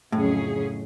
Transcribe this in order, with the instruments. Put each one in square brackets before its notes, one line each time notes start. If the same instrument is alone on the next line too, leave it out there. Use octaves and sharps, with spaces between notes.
[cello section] F2 C#3 F#3 C#4 G#4 [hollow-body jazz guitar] A2